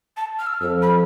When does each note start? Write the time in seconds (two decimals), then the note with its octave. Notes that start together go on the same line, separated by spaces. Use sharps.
0.17 A5
0.39 F6
0.46 E6
0.53 F6
0.61 F2 E6
0.82 B5